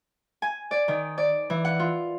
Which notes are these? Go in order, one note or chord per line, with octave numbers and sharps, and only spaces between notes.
G#5
D5
D#3
D5
E3
F#5
F4